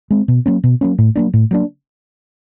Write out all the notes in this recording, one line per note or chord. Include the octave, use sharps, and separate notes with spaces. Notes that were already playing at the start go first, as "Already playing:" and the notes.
G#3 C4
B2
F#3 A#3 C#4
B2
F#3 A#3 C#4
A2
F#3 A#3 D4
A2
F#3 A#3 D4